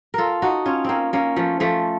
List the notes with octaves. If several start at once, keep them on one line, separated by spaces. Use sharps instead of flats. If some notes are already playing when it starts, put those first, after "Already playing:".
F4 A4 A#4
D#4 F#4
C#4 F4
A#3 C4 C#4
A#3 C#4
F3 A3
F3 A3